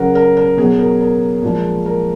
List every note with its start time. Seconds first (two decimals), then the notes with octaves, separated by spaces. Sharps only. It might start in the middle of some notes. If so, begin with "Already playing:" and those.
Already playing: C#3 F#3 A#4 F#5
0.15 A#4
0.37 A#4
0.57 B2 F#3 G#4
0.79 A#4
1.00 A#4
1.42 A#2 F3 G#3
1.86 A#4